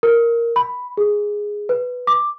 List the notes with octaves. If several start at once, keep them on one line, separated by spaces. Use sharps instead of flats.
A#4
B5
G#4
B4
D6